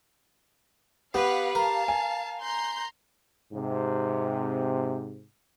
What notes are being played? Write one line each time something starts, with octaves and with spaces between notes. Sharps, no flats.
B3 G4 B4 F5 F#5
A#4 F5 A5
G#5
A#5 C6 G6
G#2 C3